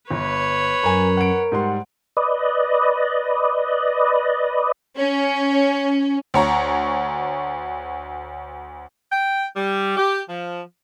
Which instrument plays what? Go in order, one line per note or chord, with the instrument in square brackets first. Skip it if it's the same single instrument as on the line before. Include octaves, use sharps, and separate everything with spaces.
[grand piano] G1 [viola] B4 C#5
[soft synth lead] F#2 [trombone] A#4 [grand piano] G#5 A#5
[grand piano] F#5 D7
[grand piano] G#2 G3 C6 [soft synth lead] F#5
[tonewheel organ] B4 D5 D#5
[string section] C#4
[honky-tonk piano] D2 C#5 A#5
[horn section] G5
G3
G4
F3